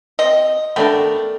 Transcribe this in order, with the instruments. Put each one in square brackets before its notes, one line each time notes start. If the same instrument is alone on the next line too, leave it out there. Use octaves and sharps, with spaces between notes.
[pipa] C4 D#5
[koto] A3 D4 A#4 [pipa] B3 G5